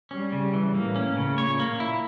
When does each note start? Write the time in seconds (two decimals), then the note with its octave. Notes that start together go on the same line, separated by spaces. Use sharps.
0.11 G3 C#4
0.32 C#3
0.54 E3
0.74 A2 A#3
0.96 C#4
1.06 A2
1.17 C#3
1.38 A#2 C#5
1.59 A#3
1.80 E4